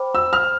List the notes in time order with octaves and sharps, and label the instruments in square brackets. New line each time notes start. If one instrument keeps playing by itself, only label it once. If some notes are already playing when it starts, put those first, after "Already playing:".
Already playing: [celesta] C5 G5 B5 D6
[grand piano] E6
F6